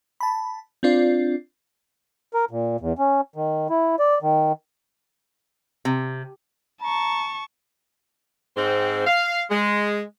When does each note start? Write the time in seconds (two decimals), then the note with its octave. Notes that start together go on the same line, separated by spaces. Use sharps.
0.20 A5 B5
0.83 C4 D4 F4 D5
2.34 A#4
2.51 A#2
2.80 E2
2.99 C#4
3.36 D#3
3.70 E4
3.99 D5
4.22 D#3
5.85 C3
6.82 A5 A#5 C#6
8.56 G#2 C4
9.07 F5
9.51 G#3